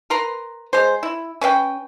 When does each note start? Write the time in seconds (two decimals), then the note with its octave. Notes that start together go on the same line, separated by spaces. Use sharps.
0.10 A#4 B4 A#5 C6
0.73 G#3 C5
1.03 E4
1.41 C#4 B4 F5 G5